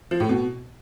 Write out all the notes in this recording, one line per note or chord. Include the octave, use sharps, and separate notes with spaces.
F3
A2
B2